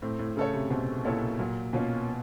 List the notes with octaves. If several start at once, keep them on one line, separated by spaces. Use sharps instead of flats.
A2 C4
A2
C#3 E4 A4 C#5
C3
B2 C4
A#2 E4 A4 C#5
A#2 F#3
B2 A#3 C#4 F4